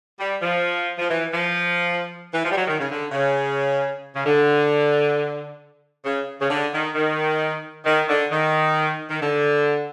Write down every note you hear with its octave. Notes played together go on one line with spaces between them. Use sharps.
G3
F3
F3
E3
F3
E3
F3
G3
F#3
D#3
C#3
D3
C#3
C#3
D3
C#3
C#3
D3
D#3
D#3
D#3
D3
D#3
D#3
D3